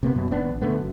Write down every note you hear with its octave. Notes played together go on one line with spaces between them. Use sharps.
C3 A#3 B3
F#2 B2
D#1 D#2 B3 D4
A#1
C#2 D3 A3 B3
F#1 F#2